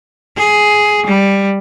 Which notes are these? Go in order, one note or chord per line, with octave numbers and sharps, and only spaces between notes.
G#4
G3